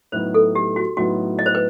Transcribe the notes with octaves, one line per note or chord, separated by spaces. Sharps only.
A2 F#3 B3 D#4 C5
A4
G4
F#4
A2 F#3 B3 D#4 F#4
D#5
C5
B4